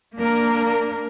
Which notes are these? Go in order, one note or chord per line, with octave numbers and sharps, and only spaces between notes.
A#3 D4 A#4